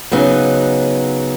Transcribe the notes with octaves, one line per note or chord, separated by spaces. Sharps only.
C#3 F#3 B3 D#4